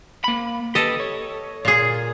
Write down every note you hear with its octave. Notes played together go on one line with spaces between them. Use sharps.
A#3 B5
G4 A4 B4 D#5
C#5
A#2 G#4